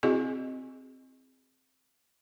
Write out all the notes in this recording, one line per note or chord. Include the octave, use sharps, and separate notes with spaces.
C4 E4 F#4 G#4 D#5